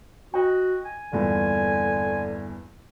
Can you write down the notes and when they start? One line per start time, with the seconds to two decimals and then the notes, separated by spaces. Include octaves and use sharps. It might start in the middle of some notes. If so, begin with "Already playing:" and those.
0.34 F#4 D#5 G5
0.85 G#5
1.13 E2 G2 A#2 D3